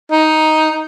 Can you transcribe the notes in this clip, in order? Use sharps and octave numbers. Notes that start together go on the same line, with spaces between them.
D#4